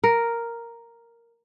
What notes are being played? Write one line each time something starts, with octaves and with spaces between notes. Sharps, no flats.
A#4